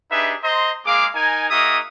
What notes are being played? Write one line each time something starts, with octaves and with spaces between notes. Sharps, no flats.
D4 D#4 G4 G#4 B4 E5
C5 D#5 A#5 C6
G#3 A#3 G#4 F5 D6
D#4 A#4 D#5 G#5
A#3 D#4 F#4 G#4 E5 D#6